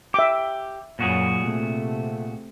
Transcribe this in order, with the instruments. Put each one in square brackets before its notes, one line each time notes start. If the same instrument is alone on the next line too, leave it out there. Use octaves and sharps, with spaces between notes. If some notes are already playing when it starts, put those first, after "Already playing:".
[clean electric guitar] G4 [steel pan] E5 D6
[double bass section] F#2 F#3 [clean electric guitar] A#2 F#4 G#4
[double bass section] C3 A3